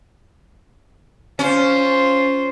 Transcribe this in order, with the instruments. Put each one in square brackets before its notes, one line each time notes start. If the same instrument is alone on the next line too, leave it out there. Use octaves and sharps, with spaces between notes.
[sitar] C#4 [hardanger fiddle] F4 C5